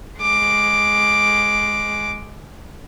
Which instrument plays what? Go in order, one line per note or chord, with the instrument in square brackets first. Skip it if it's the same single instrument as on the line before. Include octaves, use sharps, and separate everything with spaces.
[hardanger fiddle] G#3 D6